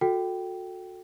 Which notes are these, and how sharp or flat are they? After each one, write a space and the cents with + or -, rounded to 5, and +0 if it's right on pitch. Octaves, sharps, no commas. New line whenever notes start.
F#4 -30 A4 +0 G5 -15